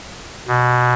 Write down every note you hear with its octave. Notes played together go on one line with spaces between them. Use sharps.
B2